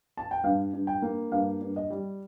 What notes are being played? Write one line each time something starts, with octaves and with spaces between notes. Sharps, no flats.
A5
G5
G2 F5
G2
G5
A#3
G2 F5
G2
D#5
G3